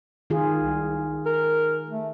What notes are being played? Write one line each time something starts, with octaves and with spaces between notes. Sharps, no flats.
D#3 F4 G#4
C2
A#4
A3